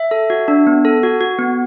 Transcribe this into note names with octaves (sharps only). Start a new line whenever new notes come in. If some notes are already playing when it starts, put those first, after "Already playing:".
Already playing: E5
A4
F#4
D4
B3
A4
F#4
F#4
B3